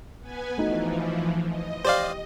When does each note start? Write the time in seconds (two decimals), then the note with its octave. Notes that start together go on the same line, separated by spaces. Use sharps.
0.21 B3 B4 G#5
0.58 E3 F3 A3 D#4 F#4
1.47 D#5
1.85 G4 C5 D5 F5